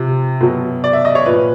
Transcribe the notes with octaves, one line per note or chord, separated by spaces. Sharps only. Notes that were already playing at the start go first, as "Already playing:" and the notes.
Already playing: C3 F3
B2 F#3
D5
E5
D#5
C#5
A#2 F3 B4